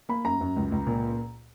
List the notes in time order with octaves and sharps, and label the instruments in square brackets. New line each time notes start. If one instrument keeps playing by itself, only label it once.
[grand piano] A#3 B5
F#2 A#5
F#2
C#2
C#2
A#2